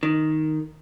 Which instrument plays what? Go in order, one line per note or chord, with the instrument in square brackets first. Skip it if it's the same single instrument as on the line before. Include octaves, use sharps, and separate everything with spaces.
[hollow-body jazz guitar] D#3